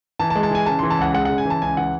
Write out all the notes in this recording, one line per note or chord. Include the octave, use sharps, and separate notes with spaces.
E3 A5
A5
G#3
A5
E3 G#5
C#3 A5
E3 C6
A5
C#2 F#5
G#3 F#5
C#3 F#5
G#5
E3
A5
C#2 G#5
E3 F#5